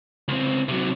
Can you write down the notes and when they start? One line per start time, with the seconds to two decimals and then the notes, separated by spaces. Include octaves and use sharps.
0.28 C#2 C4
0.69 C3 F#3